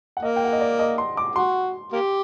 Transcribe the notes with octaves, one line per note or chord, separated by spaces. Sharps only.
F#5
A#3 D#5
G5
F#5
D#5
D5
D#5
C6
D6
F#4 C6
A#3 G4